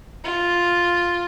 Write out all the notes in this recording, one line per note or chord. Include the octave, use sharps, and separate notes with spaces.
F4